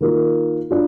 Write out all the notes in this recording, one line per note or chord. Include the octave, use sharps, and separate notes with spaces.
D#3 A#3 F4
D4 F4